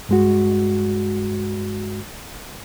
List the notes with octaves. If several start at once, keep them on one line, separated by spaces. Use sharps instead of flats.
G2 G#3 F#4